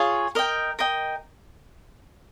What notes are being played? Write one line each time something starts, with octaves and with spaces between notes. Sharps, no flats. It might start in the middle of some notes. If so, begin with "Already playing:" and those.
Already playing: F4 G#4 C#5
A#4 D#5 G5
A#4 D#5 G5